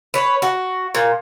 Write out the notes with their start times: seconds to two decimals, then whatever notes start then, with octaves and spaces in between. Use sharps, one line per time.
0.14 B4 C#5
0.42 F#4
0.95 A#2